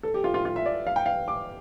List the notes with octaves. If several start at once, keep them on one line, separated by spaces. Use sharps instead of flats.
A4
G4
F4
F4
F4
E5
D5
F5
G5
F5
D6